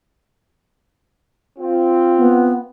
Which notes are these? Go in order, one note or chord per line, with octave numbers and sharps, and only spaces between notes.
C4 F4
B3